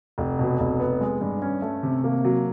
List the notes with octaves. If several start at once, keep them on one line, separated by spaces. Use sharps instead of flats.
F1
B2
F1
B3
G#3
G2
C#4
A3
C3
A#3
F#3